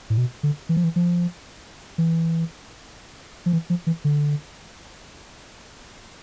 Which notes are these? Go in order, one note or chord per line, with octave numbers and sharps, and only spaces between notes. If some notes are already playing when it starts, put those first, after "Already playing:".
A2
B2
D3
E3
F3
E3
F3
E3
F3
E3
F3
E3
D3